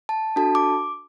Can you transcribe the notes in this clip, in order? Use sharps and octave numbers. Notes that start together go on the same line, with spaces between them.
A5
D4 F#4 A4 A5
D6